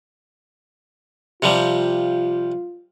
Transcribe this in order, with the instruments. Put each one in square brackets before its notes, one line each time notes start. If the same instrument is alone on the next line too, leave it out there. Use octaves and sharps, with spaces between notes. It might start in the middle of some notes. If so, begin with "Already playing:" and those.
[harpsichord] C3 F3 G3 [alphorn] F4